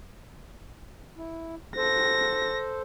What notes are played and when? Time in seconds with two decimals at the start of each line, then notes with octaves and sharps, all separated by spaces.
1.17 E4
1.77 A4 C5 A#6